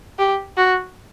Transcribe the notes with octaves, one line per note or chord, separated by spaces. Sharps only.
G4
F#4